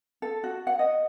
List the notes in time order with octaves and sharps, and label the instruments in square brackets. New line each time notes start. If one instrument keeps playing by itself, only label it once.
[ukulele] A4
F#4
F#5
D#5